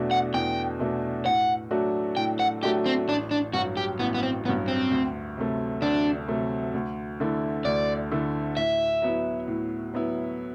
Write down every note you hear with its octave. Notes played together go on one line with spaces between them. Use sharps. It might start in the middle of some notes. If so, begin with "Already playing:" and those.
Already playing: E2 B2 A3 D4 F#4
F#5
E2 G5
B2 A3 D4 F#4
A2 F#5
F#3 A3 D4 F#4
A2 G5
F#5
F#3 A3 D4 F#4 G4
C4
A1 D4
D4
G2 F#3 F#4
G4
A1 B3
B3
C4
G2 F#3 B3
C4
D2
C3 F#3 A3
D2 D4
C3 F#3 A3
D2
D3 A3 E4
D2 D5
D3 A3 E4
A2 E5
F#3 B3 E4
A2
F#3 B3 E4